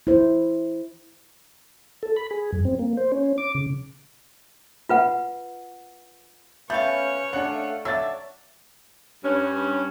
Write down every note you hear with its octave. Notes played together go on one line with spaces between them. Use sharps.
E4 C5
A4
B5
G#4
F#2
C4
A#3
C5
C#4
D6
C#3
F4 B4 F#5
A3 B3 C#4 B4 C#5 F5 G6
C#3 A3 D4 F5 F#5
F#3 D4 E5 A6
G2 C#4